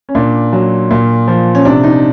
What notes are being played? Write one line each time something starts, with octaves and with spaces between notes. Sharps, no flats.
C#4
A#2 D4
F#3
A#2
F3
C#4
C3 D4
D#4